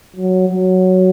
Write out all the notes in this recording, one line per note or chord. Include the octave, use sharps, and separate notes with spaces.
F#3
F#3